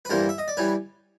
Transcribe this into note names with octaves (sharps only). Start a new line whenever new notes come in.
B4
G2 E3 G3 A#3 A#4 C5
E5
D#5
D5
E3 G3 B4 C#5